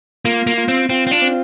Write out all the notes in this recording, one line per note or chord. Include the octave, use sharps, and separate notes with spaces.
A#3 F4
A#3
F4
C4
C4 F4
C4
D4
C4